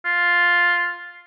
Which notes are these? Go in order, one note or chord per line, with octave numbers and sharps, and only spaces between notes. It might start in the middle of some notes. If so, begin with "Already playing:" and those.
F4